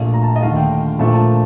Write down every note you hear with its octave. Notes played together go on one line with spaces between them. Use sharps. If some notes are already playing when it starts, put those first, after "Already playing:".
Already playing: A#1 A#2 A3
A#5
A5
D#5
D#2 D3 A3 F5
G5
A#1 A#2 F3 A3 A5
A5